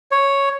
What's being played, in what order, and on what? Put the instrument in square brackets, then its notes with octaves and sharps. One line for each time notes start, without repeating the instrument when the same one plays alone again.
[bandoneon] C#5